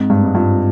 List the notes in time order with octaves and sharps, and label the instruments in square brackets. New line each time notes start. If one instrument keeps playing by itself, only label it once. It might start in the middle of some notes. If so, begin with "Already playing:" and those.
Already playing: [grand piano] G#2 [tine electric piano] C4
[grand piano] G2 [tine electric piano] G#3
[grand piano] G#2
[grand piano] G2 [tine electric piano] F4